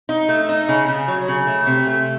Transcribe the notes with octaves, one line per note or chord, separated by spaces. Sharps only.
D#4
A3
D#4
C#3
C#3
F#3
C#3
A3
C3
A3